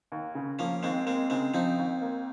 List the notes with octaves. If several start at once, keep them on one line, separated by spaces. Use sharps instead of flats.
D#2
C#3
F3 A#3 C#4
D#2 G#3 C4
G#3 A#3 C4
C#3 G#3 C4
F3 C4 D#4
D#2
A#3